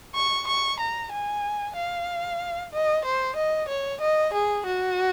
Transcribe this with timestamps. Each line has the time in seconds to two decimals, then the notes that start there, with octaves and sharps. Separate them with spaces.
0.15 C#6
0.47 C#6
0.79 A#5
1.12 G#5
1.76 F5
2.73 D#5
3.05 C5
3.36 D#5
3.69 C#5
4.01 D#5
4.33 G#4
4.66 F#4